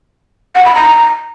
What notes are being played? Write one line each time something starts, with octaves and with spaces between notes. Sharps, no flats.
F#5
B5
A#5